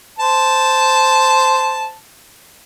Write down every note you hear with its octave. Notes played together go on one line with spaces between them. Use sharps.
C5 A5